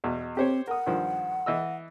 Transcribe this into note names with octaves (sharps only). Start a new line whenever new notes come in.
E2 B2
C4 G4 C5 C#5
A#4 F#5 D#6
G2 D#3 F3
E3 D#5 E6